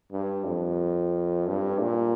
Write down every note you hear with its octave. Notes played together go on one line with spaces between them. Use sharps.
G2
F2
G2
A#2